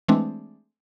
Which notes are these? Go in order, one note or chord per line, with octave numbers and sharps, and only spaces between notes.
E3 G#3 A3 C4 D4